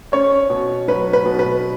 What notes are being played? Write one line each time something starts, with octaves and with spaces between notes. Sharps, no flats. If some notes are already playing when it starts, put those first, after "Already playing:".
C#4 C#5
B2
F#3 B4
B4
B2
B4